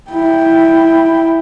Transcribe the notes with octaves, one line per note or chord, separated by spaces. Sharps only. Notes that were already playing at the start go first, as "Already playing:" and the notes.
E4 G5